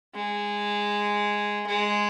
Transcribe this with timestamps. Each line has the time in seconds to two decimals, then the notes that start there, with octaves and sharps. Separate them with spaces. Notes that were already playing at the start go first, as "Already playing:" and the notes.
0.15 G#3
1.67 G#3